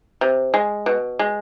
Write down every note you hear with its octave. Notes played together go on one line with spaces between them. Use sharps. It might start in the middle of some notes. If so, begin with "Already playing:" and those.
C3
G#3
B2
G#3